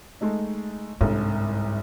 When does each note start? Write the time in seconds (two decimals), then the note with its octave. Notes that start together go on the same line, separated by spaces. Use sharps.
0.21 G#3 A3 D#4
1.01 G1 C2 G#2